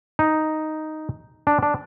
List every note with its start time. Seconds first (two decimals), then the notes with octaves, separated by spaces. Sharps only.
0.19 D#4
1.47 D4
1.63 D4